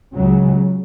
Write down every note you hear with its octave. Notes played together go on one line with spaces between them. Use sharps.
C#2 C#3 F#3